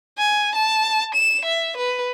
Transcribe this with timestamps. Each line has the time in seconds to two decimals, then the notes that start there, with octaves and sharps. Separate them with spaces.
0.18 G#5
0.55 A5
1.15 E7
1.45 E5
1.77 B4